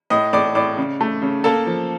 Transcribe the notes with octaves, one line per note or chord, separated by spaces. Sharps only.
A2 D#5 D#6
A2 D5 D6
A2 D5 D6
C#3
A3
C#3
A#3 A4 A5
F3